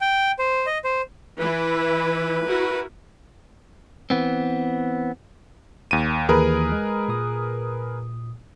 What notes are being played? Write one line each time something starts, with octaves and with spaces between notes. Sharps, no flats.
G5
C5
D#5
C5
E3 E4 B4
E4 F#4 A#4
E3 B3 C4
D#2 D#7
D#2 E3 G#4 A#4 B4 B5
G#3
A#2 D#6